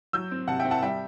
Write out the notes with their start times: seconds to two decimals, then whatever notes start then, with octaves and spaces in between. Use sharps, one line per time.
0.13 F#3 E6 G6
0.31 C4
0.48 C3 F#5 A5
0.60 C4 E5 G5
0.71 F#5 A5
0.82 G3 E5 G5